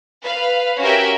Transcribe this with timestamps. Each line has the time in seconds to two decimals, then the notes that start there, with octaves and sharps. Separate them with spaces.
0.23 B4 F5
0.80 C#4 F#4 G4 A#4 E5 G5